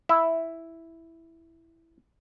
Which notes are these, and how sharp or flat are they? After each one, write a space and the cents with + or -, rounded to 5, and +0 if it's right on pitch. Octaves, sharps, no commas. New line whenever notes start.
E4 +0 E5 +0